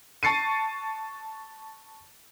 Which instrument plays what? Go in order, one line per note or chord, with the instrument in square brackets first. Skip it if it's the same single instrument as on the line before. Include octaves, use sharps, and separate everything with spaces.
[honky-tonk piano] A5 C#6 A6 C7 C#7 D#7